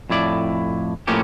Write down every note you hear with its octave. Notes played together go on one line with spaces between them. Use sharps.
F2 A2 E4 D5
A2 F3 A3 A#3 C#4 G4